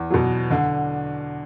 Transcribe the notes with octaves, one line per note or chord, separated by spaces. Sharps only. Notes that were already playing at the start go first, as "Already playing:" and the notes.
Already playing: E2
B2 F#3
D3